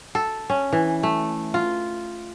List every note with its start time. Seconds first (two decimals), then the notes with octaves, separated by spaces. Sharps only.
0.15 A4
0.50 C#4
0.73 E3
1.03 A3
1.54 F4